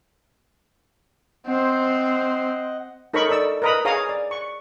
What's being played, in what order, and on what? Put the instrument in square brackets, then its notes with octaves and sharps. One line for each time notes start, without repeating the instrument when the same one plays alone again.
[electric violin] C4 C5 [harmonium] D#5 F#5
[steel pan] D#4 A4 A#4 C#5 B5 C#6
A4 D5 E6
A#4 B4 D#5 A#5 B5 D#6
G#4 C#5 F5 A#5 D#6
D5
C#6